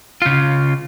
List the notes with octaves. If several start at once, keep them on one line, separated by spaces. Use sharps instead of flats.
C#3 F4